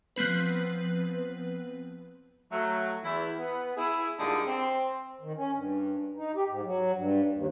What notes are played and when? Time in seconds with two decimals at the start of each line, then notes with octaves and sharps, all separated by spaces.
0.16 F3 B3 C4 B4
2.51 F#3 A3
3.03 E2 E4
3.37 B3
3.77 E4 G#4
4.19 A#2 D3 G3 G#3 D#4 G#4
4.47 C4
5.21 D#3
5.37 C#4
5.54 G2
6.16 D#4
6.36 G4
6.49 G#2
6.64 F#3
6.96 G2
7.33 D#2